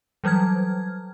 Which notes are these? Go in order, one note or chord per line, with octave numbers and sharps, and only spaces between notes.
E3 F#3 G3 F6 G#6